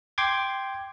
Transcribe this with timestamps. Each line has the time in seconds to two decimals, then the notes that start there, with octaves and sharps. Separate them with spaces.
0.18 G5 C6 D6 G#6